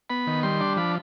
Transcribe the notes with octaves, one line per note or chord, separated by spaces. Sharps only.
B3 B5
D#3
G3 C6
D4
F3 B5